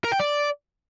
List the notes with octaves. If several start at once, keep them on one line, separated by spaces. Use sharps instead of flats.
A#4
G5
D5